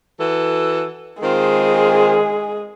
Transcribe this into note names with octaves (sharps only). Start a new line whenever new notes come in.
E3 F#4 A4
D#3 G#3 C4 F4 G#4